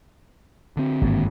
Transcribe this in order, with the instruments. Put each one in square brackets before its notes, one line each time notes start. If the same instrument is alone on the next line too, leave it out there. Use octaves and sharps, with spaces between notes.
[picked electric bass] D3 C4
[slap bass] G#1 G2 A#3